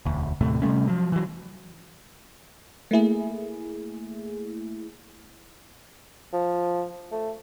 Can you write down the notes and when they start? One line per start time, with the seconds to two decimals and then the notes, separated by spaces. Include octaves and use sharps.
0.06 E1 D2
0.41 D#2 A2 C3 A3
0.62 C3 G3 A3 C#4
0.87 F3 F#3
1.12 E3 F#3
2.91 A3 A#3 E4 G#4
6.33 F3
7.12 A3